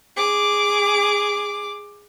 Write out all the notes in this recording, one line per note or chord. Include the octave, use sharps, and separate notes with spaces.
G#4 D6